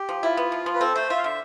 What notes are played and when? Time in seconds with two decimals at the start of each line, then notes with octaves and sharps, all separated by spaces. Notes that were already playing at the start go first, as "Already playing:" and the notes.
Already playing: G4
0.09 F3
0.23 E4 F4
0.37 B3
0.52 F3
0.66 F3
0.74 B4
0.81 C4 A4
0.95 A3 C5
1.10 F4 E5
1.18 F5
1.24 D3 E5